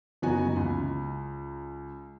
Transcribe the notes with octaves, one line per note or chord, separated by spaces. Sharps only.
F#1 E3 B3 D#4 F#4 G#5
C#2